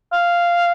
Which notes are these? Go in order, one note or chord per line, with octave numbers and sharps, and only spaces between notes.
F5